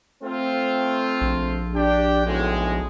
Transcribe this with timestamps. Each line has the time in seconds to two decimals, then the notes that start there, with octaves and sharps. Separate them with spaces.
0.24 A3 C4 F4
1.21 A#1
1.75 D4 G4 G5
2.26 B1 A2 G#3